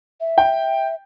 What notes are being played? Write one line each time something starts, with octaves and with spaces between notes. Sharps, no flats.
E5
G5